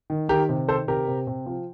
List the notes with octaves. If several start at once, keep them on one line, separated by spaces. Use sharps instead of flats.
D#3
D#3 G4 A#4
C3
D#3 A4 C5
C3 G4 A#4
C3
C3
F3